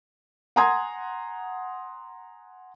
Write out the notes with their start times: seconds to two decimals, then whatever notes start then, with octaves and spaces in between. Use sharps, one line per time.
0.56 F#5 G#5 A#5 C6 D#6 G#6